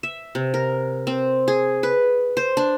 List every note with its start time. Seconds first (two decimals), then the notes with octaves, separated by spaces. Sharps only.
0.03 E5
0.35 C3
0.54 A#4
1.07 C4
1.48 G#4
1.83 B4
2.37 C5
2.57 D4